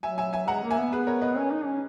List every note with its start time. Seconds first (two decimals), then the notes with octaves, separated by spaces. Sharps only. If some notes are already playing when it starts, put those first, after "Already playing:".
0.03 F#3 E5 G#5
0.18 E5 G#5
0.33 E5 G#5
0.48 G#3 F#5 A#5
0.63 A#3
0.70 E5 G#5
0.78 B3
0.92 G#4 B4
1.07 A#4 C#5
1.22 B4 D#5
1.36 C#4 A#4 C#5
1.51 D#4
1.66 C#4